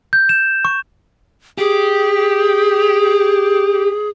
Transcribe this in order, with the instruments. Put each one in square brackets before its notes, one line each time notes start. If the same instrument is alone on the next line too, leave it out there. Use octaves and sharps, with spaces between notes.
[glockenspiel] G6
E7
C#6
[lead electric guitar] G4 [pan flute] G#4